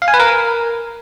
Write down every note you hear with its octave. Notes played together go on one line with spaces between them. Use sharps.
F5
G#5
B4
A#4